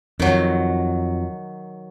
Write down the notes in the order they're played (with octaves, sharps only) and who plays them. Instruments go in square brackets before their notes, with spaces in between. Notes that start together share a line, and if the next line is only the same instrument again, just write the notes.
[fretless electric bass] F2 [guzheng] D#3 F#3